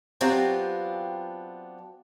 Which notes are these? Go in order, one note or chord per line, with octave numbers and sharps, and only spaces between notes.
F#3 B3 C4 D4 F4 G4